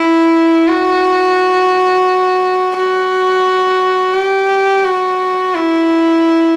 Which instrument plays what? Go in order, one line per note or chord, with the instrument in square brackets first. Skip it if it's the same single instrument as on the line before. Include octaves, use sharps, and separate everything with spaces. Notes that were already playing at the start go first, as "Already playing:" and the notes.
Already playing: [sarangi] E4
F#4
F#4
G4
F#4
E4